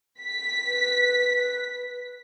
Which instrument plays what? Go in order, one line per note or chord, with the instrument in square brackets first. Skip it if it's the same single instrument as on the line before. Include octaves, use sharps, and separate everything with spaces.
[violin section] B6
[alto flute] B4